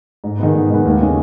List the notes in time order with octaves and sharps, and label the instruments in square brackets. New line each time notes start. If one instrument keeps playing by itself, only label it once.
[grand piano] G#2
D#3 G#3 B3
G#2
D#3 G#3 B3
D#2
C#3 G#3